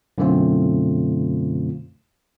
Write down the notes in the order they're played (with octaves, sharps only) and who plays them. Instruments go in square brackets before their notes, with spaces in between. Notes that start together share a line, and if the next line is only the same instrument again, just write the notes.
[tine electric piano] F#2 B2 D3 A3 C4 F4